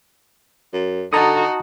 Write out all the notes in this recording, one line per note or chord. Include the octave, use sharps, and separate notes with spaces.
F#2
D3 D#4 F#4 A5 A#5 D#6